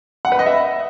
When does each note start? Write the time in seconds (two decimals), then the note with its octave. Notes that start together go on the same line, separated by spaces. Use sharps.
0.25 F#5
0.32 B4
0.39 D#5
0.46 E5